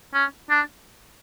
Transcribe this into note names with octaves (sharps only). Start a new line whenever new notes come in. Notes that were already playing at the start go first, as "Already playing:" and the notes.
C#4
D4